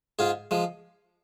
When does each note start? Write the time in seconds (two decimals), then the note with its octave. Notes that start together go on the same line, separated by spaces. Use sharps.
0.19 G#2 F4 G#4
0.51 F3 G#3